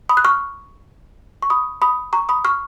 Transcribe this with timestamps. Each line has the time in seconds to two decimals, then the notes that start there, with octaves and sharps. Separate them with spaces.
0.09 B5 D#6
0.17 F#6
0.25 C#6 F6
1.42 C#6
1.50 B5 D#6
1.82 B5 D#6
2.13 A#5 C#6
2.29 B5 D#6
2.45 C#6 F6